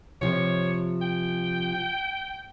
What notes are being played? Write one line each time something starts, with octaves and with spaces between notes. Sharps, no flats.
C3 F3 C#5
G5